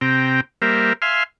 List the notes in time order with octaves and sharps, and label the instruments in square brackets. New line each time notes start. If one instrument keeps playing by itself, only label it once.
[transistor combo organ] C3 C4 G5 A#5
G3 A#3 A#4 C5 E5
E5 F5 G#5 C6 F6